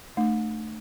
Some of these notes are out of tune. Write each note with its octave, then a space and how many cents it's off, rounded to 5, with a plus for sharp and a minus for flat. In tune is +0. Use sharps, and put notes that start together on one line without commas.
A3 +0 D4 +35